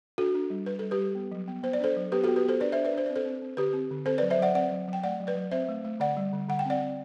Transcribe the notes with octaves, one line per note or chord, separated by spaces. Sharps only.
D4 F#4 A4
D4
G3
G3 B4
G3 A4
G4 B4
G3
B3
F#3
B3
B3 C5
D5
D4 A4 C5
F#3
B3 G4 B4
B3 F#4 A4
G4 B4
B3 A4 C5
D4 B4 D5
D4 C5 E5
B4 D5
D4 C5
C4 D5
A4 C5
C4
C4
D3 G4 B4
C4
D3
C4 A4 C5
F#3 B4 D5
C5 E5
F#3 D5 F#5
C4 D5 F#5
F#3
F#3
G5
A3 D5 F#5
F#3
B4 D5
F#3
C4 C5 E5
A3
A3
D3 D5 F#5
G3
D3
D3 F#5
G5
C4 D5 F#5
C4